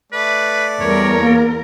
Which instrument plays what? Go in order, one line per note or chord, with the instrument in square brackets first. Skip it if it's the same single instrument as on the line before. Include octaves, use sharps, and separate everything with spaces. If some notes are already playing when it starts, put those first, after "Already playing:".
[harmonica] A3 D5 [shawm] B4
[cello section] E2 A#4 [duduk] G3 [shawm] C#5
[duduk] A#3